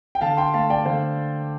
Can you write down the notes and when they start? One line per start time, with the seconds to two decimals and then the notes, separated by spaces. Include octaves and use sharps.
0.15 G5
0.21 D3 F5 A5
0.37 G5 C6
0.54 A3 F5 A5
0.70 D5 G5
0.85 D3 C5 F5